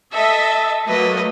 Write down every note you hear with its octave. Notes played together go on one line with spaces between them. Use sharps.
A4 D#5 E5
F#3 A3 A#3 B4 D#5